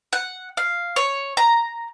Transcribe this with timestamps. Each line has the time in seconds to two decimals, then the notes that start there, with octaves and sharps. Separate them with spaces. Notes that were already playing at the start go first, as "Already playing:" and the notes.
0.13 F#5
0.57 F5
0.96 C#5
1.37 A#5